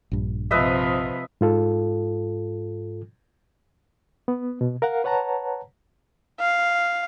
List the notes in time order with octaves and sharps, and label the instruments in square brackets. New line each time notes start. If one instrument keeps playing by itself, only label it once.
[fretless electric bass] A#1 G2
[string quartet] C3 F3 [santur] B4 D#5 E5
[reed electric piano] G#2 F4 A4
B3
B2
A#4 F5 F#5
B4 C#5 F#5 A5 A#5
[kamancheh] F5